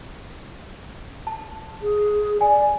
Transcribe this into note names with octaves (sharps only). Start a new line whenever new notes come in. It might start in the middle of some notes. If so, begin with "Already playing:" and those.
A5
G#4
D5 G#5